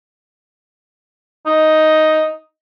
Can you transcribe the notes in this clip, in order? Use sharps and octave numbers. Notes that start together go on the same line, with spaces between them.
D#4